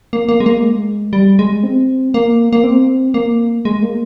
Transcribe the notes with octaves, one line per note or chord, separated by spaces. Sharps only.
A#3
A#3
G#3
A#3
G#3
G3
G#3
C4
A#3
A#3
C4
A#3
G#3
A#3